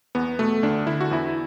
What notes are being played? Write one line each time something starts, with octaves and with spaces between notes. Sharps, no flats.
E2 B3
B2 A3
D2 D4
D3 E4
F#4
E2 E4